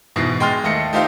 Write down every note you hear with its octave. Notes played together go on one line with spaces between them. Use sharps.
G#2 B2 E3 A#6 C7
G#3 G5 C6 F6 A6
D#2 A3 D#5 A#6 C#7
A3 D#4 F4 G4 C5 F5